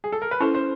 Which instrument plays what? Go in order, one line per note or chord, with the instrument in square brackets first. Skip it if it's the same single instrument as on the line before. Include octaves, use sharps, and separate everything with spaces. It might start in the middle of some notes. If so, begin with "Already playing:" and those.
[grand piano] G#4
A4
A#4
B4
[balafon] C#4 E4 A4 [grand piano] C5
[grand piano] C5